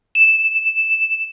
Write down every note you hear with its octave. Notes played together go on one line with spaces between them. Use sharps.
E7